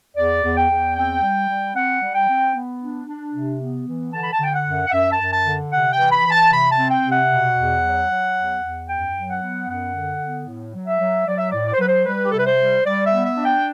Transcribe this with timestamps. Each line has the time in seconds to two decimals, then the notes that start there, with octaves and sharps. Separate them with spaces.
0.16 E2 D5
0.43 E2
0.56 G5
0.69 E2
0.96 C4 G5
1.22 G3
1.49 G3
1.75 C4 F#5
2.01 G3
2.15 G5
2.28 C4
2.55 B3
2.81 D4
3.07 D4
3.34 C3
3.60 B3
3.86 E3
4.13 D3 A5
4.23 B5
4.33 A5
4.39 D3 G5
4.53 F#5
4.66 F#2
4.87 F#5
4.92 F#2 E5
5.12 A5
5.19 F#2
5.32 A5
5.45 D3
5.72 C3 F#5
5.92 G5
5.97 E3
6.11 B5
6.25 E3
6.30 A5
6.51 C3 B5
6.70 A5
6.77 C4
6.90 G5
7.04 C3
7.11 F#5
7.30 B2
7.56 E2
7.82 F#3
8.10 F#3
8.36 E2
8.62 E2
8.89 F#2 G5
9.15 F#3
9.28 F#5
9.41 B3
9.68 F#2 F#5
9.94 D3
10.21 B3
10.47 A2
10.74 F#3
10.87 E5
11.00 F#3
11.26 F#3 D5
11.38 E5
11.50 A2 D5
11.66 D5
11.73 C5
11.79 F#3 B4
11.87 C5
12.05 G3 B4
12.24 G4
12.31 C3 A4
12.38 B4
12.46 C5
12.58 G3
12.85 G3 D5
13.05 E5
13.12 B3
13.25 E5
13.37 D4
13.45 G5